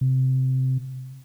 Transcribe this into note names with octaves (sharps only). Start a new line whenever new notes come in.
C3